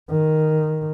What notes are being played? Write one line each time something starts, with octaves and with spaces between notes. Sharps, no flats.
D#3